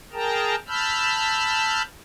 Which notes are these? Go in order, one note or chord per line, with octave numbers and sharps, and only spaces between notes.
G#4 A#4 G5 A5 A#5
A5 B5 E6 F6 G6